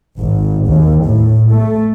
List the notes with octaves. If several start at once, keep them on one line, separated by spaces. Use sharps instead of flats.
G#1
D#2
A2
A3